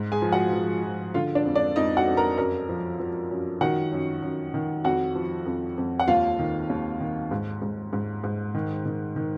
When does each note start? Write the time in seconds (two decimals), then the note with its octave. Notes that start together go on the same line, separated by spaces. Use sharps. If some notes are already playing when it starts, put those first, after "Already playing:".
Already playing: G#2
0.12 G#4 G#5
0.22 F3
0.32 F#4 F#5
0.53 F3
0.84 F3
1.14 D3 F4 F5
1.35 D4 D5
1.45 F2
1.55 D4 D5
1.76 F2 D#4 D#5
1.97 F#4 F#5
2.07 F2
2.17 A#4 A#5
2.38 F#2 A#4 A#5
2.69 F3
2.99 F3
3.31 F#2
3.61 D#3 F#4 F#5
3.93 F#2
4.22 F#2
4.54 D#3
4.84 F2 F#4 F#5
5.15 F3
5.46 F2
5.77 F2
6.00 F#5
6.07 D#2 F4 F5
6.39 D#3
6.70 D#2
7.01 D#3
7.31 G#2
7.62 G#2
7.93 G#2
8.24 G#2
8.55 D#3
8.86 D#3
9.16 D#3